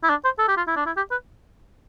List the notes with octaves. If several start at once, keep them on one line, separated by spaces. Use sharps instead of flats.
E4
D4
C5
A4
G4
F4
E4
D4
E4
G4
B4